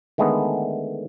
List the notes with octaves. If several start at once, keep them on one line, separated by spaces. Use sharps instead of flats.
D3 D#3 G#3 A3 B3